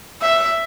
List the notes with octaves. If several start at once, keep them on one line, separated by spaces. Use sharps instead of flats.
E5